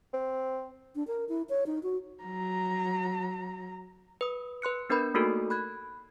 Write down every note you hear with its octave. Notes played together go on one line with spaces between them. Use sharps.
C4
D4
A#4
E4
C#5
D#4
F#4
F#3 A#5
B4 D#6
B4 C6 F#6 C#7
B3 D4 A#4 B4 B5 G6
A3 A#3 D#4 F#4 A4 A#4
B5 F#6 G#6